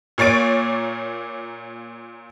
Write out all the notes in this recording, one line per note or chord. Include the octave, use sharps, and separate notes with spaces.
A#2 A#3 C#5 A6 D7